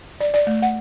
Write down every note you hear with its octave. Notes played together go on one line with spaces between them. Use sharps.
D5
D5
A3
F#5